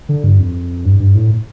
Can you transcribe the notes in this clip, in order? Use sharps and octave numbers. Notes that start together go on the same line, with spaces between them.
D3
G2
F2
G2
G2
A2